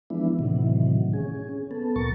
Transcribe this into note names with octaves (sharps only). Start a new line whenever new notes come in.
E3 F3 G#3 B3 D4 E4
A2 C3 D#3 E3 F#3
C#4 G#4
B3 A4
D2 A#2 F#3 A#4 C#6 A6